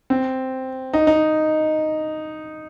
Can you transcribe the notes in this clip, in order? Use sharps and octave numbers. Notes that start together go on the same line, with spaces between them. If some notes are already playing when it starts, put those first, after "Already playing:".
C4
D#4
D#4